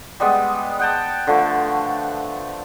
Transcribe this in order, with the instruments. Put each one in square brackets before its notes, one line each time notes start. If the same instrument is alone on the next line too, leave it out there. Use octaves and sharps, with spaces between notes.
[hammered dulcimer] G3 G#3 B3
F#5 G5 A5
D3 F3 A3